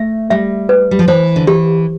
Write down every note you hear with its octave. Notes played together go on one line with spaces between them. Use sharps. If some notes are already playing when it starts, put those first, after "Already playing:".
Already playing: A3 E5
G3 E5
B4
G3
F3
E3 C5
D3
E3 G4